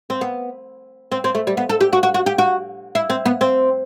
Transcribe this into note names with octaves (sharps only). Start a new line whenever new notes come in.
C4
B3
C4
C4
A3
G3
B3
A4
G4
F#4
F#4
F#4
G4
F#4
E4
C4
B3
C4